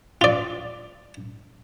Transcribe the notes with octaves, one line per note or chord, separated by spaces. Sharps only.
F4 D5